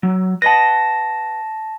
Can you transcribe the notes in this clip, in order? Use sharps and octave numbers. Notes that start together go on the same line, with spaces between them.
F#3
B4 D#5 F#5 A5 A#6